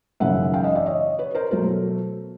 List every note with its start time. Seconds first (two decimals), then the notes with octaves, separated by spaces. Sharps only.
0.20 G#1 F#2 C#3 E3 E5 F#5
0.54 F5 G5
0.64 D#5 F5
0.75 D5 E5
0.86 C#5 D#5
1.19 B4 C#5
1.35 A#4 C5
1.51 B2 F#3 A3 A#4 C5